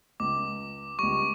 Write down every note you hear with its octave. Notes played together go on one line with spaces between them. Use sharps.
C#2 D6
C#2 G3 C#6